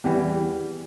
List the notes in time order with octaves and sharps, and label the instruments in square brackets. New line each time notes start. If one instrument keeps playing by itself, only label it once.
[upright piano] E2 E3 G3 G4